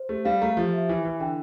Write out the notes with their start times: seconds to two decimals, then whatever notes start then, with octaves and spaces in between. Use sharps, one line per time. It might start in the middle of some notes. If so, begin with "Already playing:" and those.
Already playing: C5
0.09 A3 G4
0.25 G3 F5
0.42 A3 A#5
0.57 F3 G4
0.73 E5
0.89 E3 E4
1.05 E3 E4
1.20 D3 G5